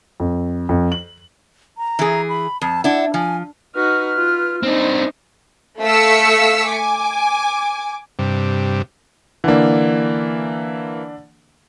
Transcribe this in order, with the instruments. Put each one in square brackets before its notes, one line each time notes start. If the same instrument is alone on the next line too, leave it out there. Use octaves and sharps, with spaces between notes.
[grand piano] F2
F2
F#7
[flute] A#5
[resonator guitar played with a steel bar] E3 G#4
[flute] B5
[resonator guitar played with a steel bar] F2 [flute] A5
[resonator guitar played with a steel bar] D4 E4 [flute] F#5
[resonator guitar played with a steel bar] F3 [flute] G#5
[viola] D#4 F#4 [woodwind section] B4 F6
[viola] F4
[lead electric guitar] C4 D4 [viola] D#4
[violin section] A3 F5 E6 B6 C#7
G#5 D6
[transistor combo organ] G2 C3
[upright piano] D3 D4 [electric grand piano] E3 A#3